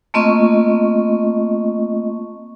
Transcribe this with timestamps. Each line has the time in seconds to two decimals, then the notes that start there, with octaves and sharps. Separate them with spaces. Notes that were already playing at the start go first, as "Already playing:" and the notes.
0.14 A3 A#3 C4 F4 D#5 C#6